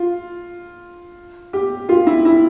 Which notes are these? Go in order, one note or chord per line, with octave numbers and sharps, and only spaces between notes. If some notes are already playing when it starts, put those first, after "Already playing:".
Already playing: F4
G4
F4
E4
E4